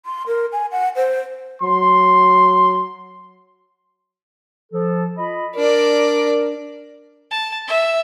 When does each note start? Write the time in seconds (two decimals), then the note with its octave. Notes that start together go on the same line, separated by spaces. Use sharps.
0.06 C6
0.27 A#4
0.52 G#5
0.72 F#5
0.96 C5
1.62 F#3 C6
4.72 F3 A4
5.17 F4 D#5 B5
5.55 D4 A#4 D5
7.31 A5
7.68 E5